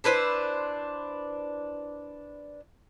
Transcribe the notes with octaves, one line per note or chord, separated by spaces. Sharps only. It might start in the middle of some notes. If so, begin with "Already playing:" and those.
D4 E4 B4 C5